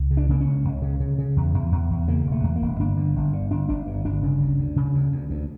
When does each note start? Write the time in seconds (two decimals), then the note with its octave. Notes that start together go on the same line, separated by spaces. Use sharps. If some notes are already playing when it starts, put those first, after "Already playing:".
Already playing: C#2
0.11 C#3
0.17 D4
0.29 C#3 A#3
0.41 C#4
0.47 C#2
0.65 C#2
0.82 C#3
1.00 C#3
1.19 C#3
1.37 E2
1.54 E2
1.72 E2
1.91 E2
2.08 C#3 A#3
2.26 E1
2.32 A3
2.43 E2
2.56 A#3
2.62 E1
2.80 G1 D4
2.97 D3
3.16 G1
3.33 D3
3.51 G1 D4
3.69 G1 D4
3.87 G2
4.05 G1 D4
4.22 C#3
4.40 D2
4.59 D2
4.76 C#3
4.94 D2
5.12 D2
5.30 D2